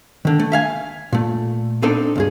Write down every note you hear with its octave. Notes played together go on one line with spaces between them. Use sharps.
D3 D#3
A3
E5 F5 G#5
A#2 A3
B3 C4 D4 D#4 A4 C5
C#2 G2 G#4